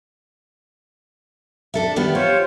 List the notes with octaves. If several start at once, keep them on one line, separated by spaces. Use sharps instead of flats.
D4 A4 E5
D#3 G3 B3
F4 G4 C5 C#5